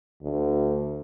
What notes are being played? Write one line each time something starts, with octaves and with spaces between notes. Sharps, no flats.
D2